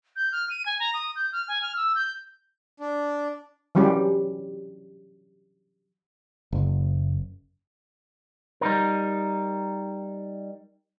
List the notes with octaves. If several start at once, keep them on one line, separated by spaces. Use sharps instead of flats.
G6
F6
D#7
G#5
A#5
D#6
G6
F6
G#5
F6
E6
G6
D4
E3 F#3 G3 C#4 G4
F#1
G3 D#4 A#4